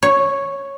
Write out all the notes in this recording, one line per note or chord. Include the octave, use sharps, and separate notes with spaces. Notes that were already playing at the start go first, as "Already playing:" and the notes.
C#5